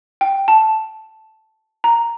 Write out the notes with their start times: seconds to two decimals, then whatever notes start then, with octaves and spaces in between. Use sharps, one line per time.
0.21 G5
0.48 A5
1.84 A#5